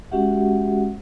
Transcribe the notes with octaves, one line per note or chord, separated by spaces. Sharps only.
G#3 C#4 F#4 G4 E5 F#5